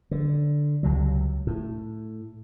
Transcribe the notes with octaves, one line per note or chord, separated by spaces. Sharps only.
D3
C#2 C3 F#3
A2